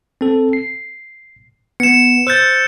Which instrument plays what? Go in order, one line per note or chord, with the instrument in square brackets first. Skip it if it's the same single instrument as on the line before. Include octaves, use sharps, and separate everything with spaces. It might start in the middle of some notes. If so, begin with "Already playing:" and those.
[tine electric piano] C4 A4
C7
[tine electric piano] B3 [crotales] C#7 E7
[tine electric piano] C5 A6 [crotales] E6 F#6 G6